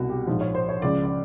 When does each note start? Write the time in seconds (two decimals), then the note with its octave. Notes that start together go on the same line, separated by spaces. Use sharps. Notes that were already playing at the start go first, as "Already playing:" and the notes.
Already playing: C2 B2 F#4
0.09 G4
0.27 A#1 G#2 F3
0.41 C#5
0.55 C5
0.69 C#5
0.82 C#2 C#3 F3 D5
1.05 D5